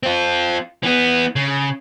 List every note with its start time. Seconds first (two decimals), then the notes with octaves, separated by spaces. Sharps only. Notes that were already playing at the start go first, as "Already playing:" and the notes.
0.03 C4 F4
0.83 E3 B3
1.36 C#3